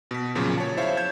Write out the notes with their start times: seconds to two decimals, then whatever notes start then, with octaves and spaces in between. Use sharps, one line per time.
0.11 B2 B6
0.35 E2 A#2 C#3 F3 F#3
0.58 C#5 A5
0.77 E4 C5 C#5 E5 F5
0.97 G6 G#6 E7